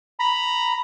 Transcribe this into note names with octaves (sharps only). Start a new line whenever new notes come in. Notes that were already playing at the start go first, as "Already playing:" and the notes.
A#5 B5